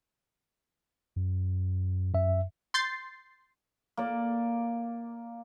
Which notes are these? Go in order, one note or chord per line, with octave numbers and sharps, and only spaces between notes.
F#2
F#2 E5
C6 G6 A6 C7
A#3 D5